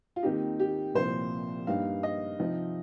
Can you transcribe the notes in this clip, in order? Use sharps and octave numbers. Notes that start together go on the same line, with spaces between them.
F4
D#2 D#3 C4 D#4 G4
G4
C2 A#2 F3 C4 C5
G2 G3 A#3 D#4 F5
D#5
C3 F3 C4 D#4